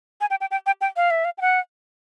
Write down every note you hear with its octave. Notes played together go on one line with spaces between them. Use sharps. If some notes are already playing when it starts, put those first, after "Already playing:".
G#5
G5
G5
G5
G5
G5
F5
E5
F5
G5
F#5